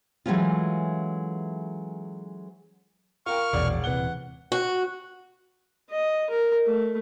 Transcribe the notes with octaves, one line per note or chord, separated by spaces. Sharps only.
E3 F#3 G#3 A3 C#4 F4
F4 A#4 G5 C#6 F6
E1 A#1 E2 B2 D5
D#1 C3 E3 F#5 G7
F#4
D#5
A#4
A3